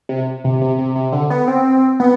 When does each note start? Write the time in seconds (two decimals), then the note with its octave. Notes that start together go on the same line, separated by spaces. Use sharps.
0.09 C3
0.44 C3
0.61 C3
0.79 C3
0.96 C3
1.12 D3
1.30 B3
1.48 C4
2.00 B3